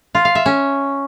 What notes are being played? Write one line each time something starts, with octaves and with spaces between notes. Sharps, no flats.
F4
F5
E5
C#4